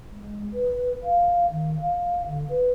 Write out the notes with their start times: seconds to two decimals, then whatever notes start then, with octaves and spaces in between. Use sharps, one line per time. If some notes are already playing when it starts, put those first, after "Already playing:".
0.10 G#3
0.53 B4
1.03 F5
1.51 D#3
1.81 F5
2.26 D3
2.50 B4